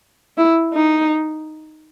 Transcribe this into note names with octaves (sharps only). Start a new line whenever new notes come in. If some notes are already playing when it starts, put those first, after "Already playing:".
E4
D#4